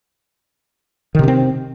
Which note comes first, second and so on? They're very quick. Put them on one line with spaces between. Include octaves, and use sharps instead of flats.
D#3 C3 C#4 C4